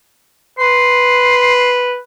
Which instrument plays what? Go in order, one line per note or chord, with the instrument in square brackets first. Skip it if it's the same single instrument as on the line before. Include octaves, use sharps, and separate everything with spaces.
[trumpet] B4 [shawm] C6